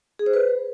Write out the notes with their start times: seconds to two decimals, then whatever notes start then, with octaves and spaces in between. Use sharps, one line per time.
0.19 G#4
0.26 C5
0.33 B4